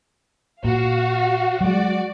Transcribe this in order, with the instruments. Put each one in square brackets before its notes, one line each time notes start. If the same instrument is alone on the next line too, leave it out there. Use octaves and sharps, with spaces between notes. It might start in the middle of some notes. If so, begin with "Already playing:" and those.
[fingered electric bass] A#2 [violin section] F#4 F5
[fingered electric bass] F#3 G#3 [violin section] F#4 D5